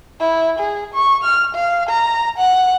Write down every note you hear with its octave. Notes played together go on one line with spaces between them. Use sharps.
E4
G#4
C#6
F6
F5
A#5
F#5